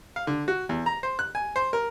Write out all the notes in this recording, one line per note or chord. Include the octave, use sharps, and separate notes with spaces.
F5
D3
F#4
E2
A#5
C5
F#6
G#5
C5
A#4